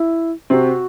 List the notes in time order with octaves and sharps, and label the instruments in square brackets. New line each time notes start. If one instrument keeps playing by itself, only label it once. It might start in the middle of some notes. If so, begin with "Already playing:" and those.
Already playing: [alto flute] E4
[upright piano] C3 C4 [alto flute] F#4